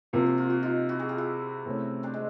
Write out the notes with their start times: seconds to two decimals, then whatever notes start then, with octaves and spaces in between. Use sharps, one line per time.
0.13 C3 F3 A#3 F4
0.26 F#4
0.38 F4
0.50 F#4
0.63 D#4 F4
0.89 E4 F#4
0.99 F#4 G#4
1.09 F4 G4
1.18 E4 F#4
1.66 C3 E3 A3 C#4
2.03 C4 D4
2.14 G#3